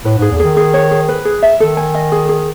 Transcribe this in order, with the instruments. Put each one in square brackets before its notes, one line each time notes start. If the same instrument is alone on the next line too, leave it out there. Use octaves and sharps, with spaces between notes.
[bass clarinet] A2 [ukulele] B4
[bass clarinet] G#2 [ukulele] G#4
[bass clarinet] E2
[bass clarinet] D#3 [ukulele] G#4
[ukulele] G#4
C#5
G#4
B4
G#4
E5
[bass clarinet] D#3 [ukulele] A4
[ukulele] G#5
D#5
G#4
G#4